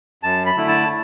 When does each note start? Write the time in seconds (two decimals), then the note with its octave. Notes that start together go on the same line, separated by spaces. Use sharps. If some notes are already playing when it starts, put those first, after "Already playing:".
0.23 F#2 A5
0.46 B5
0.57 D3 A3 E4
0.68 A5